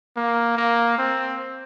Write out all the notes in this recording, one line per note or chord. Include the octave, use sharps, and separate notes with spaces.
A#3
A#3
C4